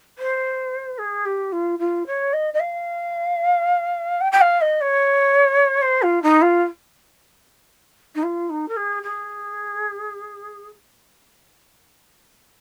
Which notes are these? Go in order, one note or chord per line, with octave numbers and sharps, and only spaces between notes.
C5
G#4
G4
F4
F4
C#5
D#5
D#5
F5
G5
G5
F5
D#5
C#5
C5
F4
D#4
F4
D#4
F4
D#4
A#4
G#4
G#4